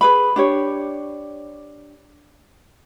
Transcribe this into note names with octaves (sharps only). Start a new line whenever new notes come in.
G#4 B4 B5
D4 G4 C#5